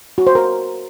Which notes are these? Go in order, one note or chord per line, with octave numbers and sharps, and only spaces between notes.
F#4
C5
A#4